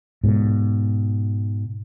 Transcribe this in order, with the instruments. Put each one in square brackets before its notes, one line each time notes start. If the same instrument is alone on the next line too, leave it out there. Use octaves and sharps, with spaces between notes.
[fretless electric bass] G#2 B2